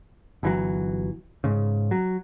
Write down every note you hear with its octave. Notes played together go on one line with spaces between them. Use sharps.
G1 E3 F#3
G#2 C#3
F#3